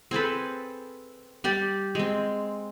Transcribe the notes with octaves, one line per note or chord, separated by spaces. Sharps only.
C4 G#4 A4 B4
G3 G4 D5
G#3 C4